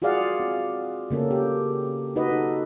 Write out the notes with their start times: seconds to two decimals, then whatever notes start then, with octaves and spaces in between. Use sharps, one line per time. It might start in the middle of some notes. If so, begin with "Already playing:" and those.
0.02 F4 F#4 G#4 D5 F5 F#5
0.40 C4
1.10 C#3 A#3 C#4 A4
1.31 G4
2.16 D#4 F#4 B4 D#5
2.31 D#4 A4